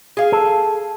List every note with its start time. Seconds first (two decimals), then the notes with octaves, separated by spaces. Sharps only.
0.17 G#4 F5
0.32 A4